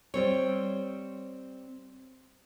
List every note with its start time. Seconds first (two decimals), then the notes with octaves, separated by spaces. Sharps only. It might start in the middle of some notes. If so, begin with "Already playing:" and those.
0.14 G3 C4 C#5